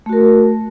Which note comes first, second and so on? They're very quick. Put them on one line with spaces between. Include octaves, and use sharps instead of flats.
A3 F#4 A#4